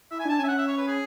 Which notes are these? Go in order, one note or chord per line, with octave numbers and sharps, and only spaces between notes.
E4 E5
G#5
D4 A5
C#4 G#5
E5
F#5
E5
C#5
B4
G#4